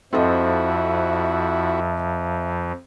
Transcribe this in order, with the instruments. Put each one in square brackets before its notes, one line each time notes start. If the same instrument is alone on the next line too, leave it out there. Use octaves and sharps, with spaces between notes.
[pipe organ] F2 F3 [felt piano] C4 A4 D#5 [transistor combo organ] E4 F#4 [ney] E5